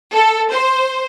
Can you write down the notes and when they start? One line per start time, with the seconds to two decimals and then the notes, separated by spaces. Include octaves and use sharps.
0.14 A4
0.52 C5